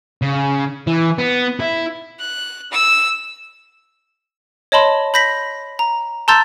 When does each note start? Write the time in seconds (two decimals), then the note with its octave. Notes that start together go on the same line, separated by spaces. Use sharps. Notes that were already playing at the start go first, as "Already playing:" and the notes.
0.22 C#3
0.87 E3
1.18 B3
1.60 E4
2.19 F#6
2.72 E6
4.72 C#5 D#5 A5 B5 C6
5.14 B5 G6 A#6 B6 F#7
5.79 A#5
6.28 A5 A#5 C6 E6 G6 A6